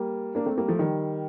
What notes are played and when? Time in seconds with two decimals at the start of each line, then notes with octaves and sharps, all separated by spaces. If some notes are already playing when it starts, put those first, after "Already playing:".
Already playing: G3 A#3
0.35 A#3 D4
0.46 A3 C4
0.57 G3 A#3
0.68 F3 A3
0.79 D#3 G3